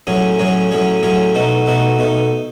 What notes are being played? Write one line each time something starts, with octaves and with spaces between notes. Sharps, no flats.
A2 F#3 C#4 G#4
A2 F#3 C#4 G#4
A2 F#3 C#4 G#4
A2 F#3 C#4 G#4
B2 A3 D#4 F#4
B2 A3 D#4 F#4
B2 A3 D#4